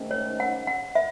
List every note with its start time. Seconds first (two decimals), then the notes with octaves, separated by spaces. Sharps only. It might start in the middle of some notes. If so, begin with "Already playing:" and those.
Already playing: G#2 D#3 A3 C#4
0.11 C#5
0.40 F#5
0.67 F#5
0.95 E5